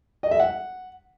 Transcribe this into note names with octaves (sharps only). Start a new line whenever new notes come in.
D#5
E5
F#5